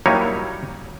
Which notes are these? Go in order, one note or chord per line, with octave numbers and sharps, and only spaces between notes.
F#3 G3 A#3 D#4 E4 C#5